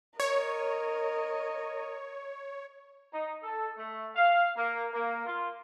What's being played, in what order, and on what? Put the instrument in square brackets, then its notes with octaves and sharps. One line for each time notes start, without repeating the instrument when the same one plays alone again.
[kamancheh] A#4 D#5 [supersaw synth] C#5
[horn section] D#4
A4
A3
F5
A#3
A#3
F4